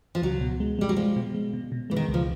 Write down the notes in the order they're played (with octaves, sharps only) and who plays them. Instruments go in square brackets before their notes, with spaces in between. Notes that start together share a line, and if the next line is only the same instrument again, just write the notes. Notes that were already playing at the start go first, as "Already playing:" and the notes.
[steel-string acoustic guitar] F3
[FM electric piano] C#2 [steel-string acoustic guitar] F#3
[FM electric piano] B2
G#3
[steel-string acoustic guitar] G3 [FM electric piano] G#3
[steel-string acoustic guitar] F#3
[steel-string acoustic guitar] F3 [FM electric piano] G#3
[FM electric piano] B2
G#3
B2
B2
[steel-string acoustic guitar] E3 [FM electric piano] G#3
[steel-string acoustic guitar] D#3
[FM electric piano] C#2
[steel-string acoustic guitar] F3